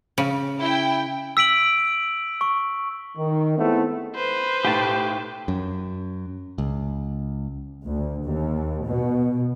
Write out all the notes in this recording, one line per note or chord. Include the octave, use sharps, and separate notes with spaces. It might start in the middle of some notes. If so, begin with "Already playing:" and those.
C#3
E4 G5
E6 B6 D7 F#7
C#6
D#3
G#3 A3 B3 C4 E4
B4 C5
B1 A2 G4 G5 A5
F#2
C#2
D2
D#2
B2